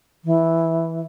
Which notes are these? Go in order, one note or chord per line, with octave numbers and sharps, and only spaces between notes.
E3